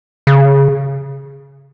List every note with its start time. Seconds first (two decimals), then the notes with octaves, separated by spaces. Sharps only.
0.27 C#3